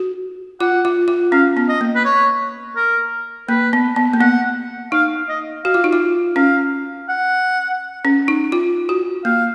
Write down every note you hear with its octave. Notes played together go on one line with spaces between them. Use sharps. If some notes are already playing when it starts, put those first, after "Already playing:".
Already playing: F#4
F4 F#5
F4
F4
C#4 F5
B3
D#5
A#3
B4
C#5
A#4
A#3 B4
B3
B3
A#3
B3 F#5
D#4 F5
D#5
F#4 F5
F4
D#4
F4
C#4 F5
F#5
C#4
D#4
F4
F#4
A#3 F5